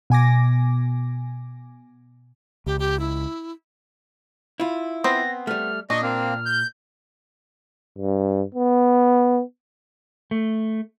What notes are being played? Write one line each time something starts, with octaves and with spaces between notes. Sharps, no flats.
B2 G#5 D6 A#6
C#2 G4
G4
E4
E4 F4
B3 C4 C5 A#6
G3 A3 F6
A#2 D4 D#5 C#6
A#3 C4 F6
G6
G2
B3
A3